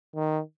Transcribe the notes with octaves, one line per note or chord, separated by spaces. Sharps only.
D#3